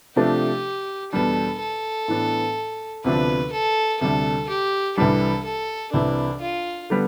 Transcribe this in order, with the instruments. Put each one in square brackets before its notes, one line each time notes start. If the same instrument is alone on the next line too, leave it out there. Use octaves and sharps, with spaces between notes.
[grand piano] C3 F3 A3 D4 [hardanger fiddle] G4
[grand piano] E2 B2 G3 D4 [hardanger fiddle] A4
[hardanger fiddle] A4
[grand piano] A2 E3 B3 D4
[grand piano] D2 C3 F3 B3 D4 [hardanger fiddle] B4
[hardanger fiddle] A4
[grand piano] D2 C3 G3 D4 [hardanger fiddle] A4
[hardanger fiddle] G4
[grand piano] C2 C3 E3 G3 D4 [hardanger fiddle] A4
[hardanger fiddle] A4
[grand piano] C2 C3 E3 [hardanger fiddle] D4
[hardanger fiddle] F4
[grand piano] D3 G3 B3